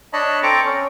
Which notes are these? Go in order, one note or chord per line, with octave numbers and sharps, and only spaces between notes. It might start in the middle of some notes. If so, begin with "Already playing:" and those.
D4 C#5 D#5 A5 B5
C4 A4 C5 A#5 C#6 D6
C#4